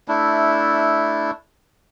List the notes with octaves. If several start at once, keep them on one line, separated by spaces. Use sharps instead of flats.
A3 D4 E4